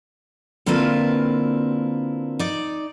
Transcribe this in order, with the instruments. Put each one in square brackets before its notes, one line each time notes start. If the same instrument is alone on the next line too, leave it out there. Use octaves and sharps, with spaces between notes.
[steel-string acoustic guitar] D3 A#3 C4 E4 F4 B4
D#4 D5